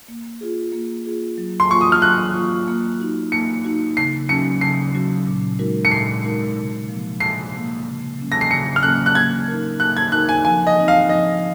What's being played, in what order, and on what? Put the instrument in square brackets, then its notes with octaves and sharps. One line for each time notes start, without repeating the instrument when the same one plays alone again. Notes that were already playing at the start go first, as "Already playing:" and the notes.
[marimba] A#3
F4 G#4
A#3
F4 G#4
F#3
[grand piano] C6
[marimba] A#3 F4 [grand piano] C#6
[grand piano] D#6
F6
[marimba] F#3 [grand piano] F#6
[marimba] A#3 F4
A#3
D#4 F#4
[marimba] A#3 [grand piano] C#7
[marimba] D#4 F#4
[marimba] C#3 [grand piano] C7
[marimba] F#3 C#4 F#4 [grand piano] C#7
[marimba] C#3 [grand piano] C7
[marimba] F#3 C#4 F#4
A#2
G#3 D#4 F#4 A#4
[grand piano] C#7
[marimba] A#2 [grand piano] C7
[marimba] G#3 D#4 F#4 A#4
C3
F3 A#3
[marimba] C3 [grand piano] C7
[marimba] F3 A#3
C#3
F#3 A#3 C#4
[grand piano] A#6
C7
[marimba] C#3 [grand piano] C#7
[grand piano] F6
[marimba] F#3 A#3 C#4 [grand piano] F#6
[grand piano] F#6
[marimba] A#3 [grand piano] G#6
[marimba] D#4 A#4
[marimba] A#3 [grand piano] F#6
[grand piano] G#6
[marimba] D#4 A#4 [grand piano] F#6
[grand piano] G#5
[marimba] F3 [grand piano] G#5
[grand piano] D#5
[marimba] C4 D#4
[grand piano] F5
[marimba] F3 [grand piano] D#5